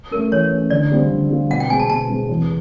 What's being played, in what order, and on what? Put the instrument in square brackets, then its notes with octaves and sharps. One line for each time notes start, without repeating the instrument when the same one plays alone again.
[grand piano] A3 C#4 [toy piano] A#4
[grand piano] E3 [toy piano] C#5
[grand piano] A3 C#4
[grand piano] D3 [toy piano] D5
[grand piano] G3 C4 F4
D3
G3 C4 F4
[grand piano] B2 [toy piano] F#5
[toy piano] G5
[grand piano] G#3 C4 [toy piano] G#5
[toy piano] A5
[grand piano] B2 [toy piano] A5
[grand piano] G#3 C4
E2